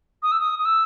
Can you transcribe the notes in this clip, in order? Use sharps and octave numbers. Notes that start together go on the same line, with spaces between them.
D#6
E6
D#6
D#6
E6